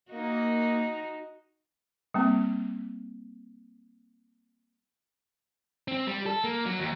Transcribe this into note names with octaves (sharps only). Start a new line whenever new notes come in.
A#3 D#4 F#4
G3 A#3 C4
C4
G3
A4
A#3
F#3
D#2